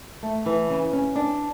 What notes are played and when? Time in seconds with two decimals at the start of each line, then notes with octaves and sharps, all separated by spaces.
0.23 A3
0.46 E3
0.70 C#3
0.93 C#4
1.16 D4